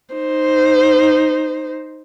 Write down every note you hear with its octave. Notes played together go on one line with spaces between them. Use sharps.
D#4 C5